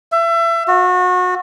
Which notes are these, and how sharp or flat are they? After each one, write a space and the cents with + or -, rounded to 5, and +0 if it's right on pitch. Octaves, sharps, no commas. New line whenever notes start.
E5 +30
F#4 -30